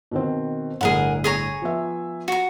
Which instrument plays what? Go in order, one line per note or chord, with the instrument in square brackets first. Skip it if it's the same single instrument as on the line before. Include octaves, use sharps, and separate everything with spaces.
[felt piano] B2 D#3 C4
[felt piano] G1 A2 [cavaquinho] G#4 A#4 F#5
[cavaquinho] G#4 C#5 A#5
[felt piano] F3 B3 E5
[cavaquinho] F#4 A#5